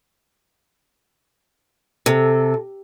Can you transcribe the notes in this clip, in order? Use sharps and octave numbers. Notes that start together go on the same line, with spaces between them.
C3 A4